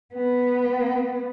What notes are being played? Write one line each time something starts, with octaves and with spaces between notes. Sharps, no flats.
B3